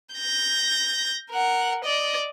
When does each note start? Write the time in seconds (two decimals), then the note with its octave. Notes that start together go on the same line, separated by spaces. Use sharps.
0.15 G6 A#6
1.30 A#4 F#5
1.84 D5 D#5